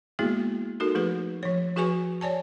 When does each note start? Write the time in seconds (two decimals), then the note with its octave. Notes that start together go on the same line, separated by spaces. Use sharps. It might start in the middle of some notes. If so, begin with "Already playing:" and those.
0.19 G#3 A#3 B3 E4 F#4 G#4
0.80 D#4 F#4 A4 A#4
0.95 F3 A3 G#4 B4
1.43 F3 C#5
1.76 F3 F#4 G#4 B4 G#5 C#6
2.21 C#5 D5 G#5 A5